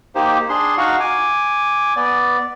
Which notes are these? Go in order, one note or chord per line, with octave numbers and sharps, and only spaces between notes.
A#3 D#4 G4 C5
D4 G#4 C6
D#4 F#4 F5 F#5 C#6
G#5 D6
B3 D5